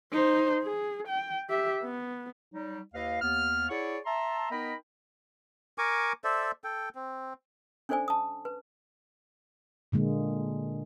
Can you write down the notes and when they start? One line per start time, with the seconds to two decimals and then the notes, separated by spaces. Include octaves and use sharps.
0.11 D#4 C5
0.63 G#4
1.08 G5
1.49 G4 E5
1.83 B3
2.53 F#3 G3 D#4
2.94 D#2 E4 B4 D#5 F5
3.21 D#2 B3 F6
3.69 E4 G#4 C#5 D5 F#5 C#6
4.05 E5 A5 A#5 C6
4.51 B3 D#4 A#4 D#5 G5 B5
5.78 A#4 G#5 C#6 D6
6.24 A4 C5 D5 E5
6.64 A4 G5
6.95 C4
7.89 C#4 D4 A4 C5 D5 G#5
8.08 A5 D#6
8.45 B4
9.92 A#2 D3 G#3 A#3